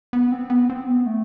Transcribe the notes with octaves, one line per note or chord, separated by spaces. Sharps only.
B3
C4
B3
C4
B3
A3